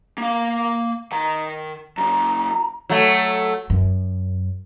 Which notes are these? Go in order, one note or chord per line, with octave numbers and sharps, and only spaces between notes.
A#3 F5
D#3 A#5
F#2 C#3 A#5
F#3 A3
F#2